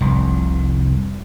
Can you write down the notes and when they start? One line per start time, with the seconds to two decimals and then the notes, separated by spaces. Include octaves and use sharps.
0.01 F1 C2